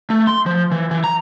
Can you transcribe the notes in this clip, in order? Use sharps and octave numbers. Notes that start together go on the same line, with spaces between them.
A3
C6
F3
E3
E3
A#5